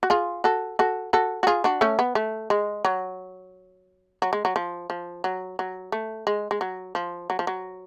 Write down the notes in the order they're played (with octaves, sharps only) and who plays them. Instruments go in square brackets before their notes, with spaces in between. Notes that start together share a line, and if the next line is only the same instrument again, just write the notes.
[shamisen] F#4
F4 G#4
F#4 A4
F#4 A4
F#4 A4
F#4
F4 G#4
D4 F#4
A3 C#4
B3
A3
G#3
F#3
F#3
G#3
F#3
F3
F3
F#3
F#3
A3
G#3
G#3
F#3
F3
F#3
F3
F#3